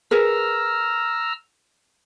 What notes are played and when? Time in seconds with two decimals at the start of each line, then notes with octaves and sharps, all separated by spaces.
0.11 G#4 A#4 B4 A#5 E6 F6